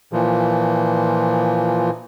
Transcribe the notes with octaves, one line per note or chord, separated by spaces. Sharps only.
A#2 E3 F3